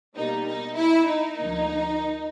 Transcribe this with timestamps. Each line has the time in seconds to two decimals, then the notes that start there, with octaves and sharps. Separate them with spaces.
0.16 B2 G3 A#3 D#4
0.46 D#4
0.77 E4
1.07 D#4
1.37 D2 D3 F3 A#3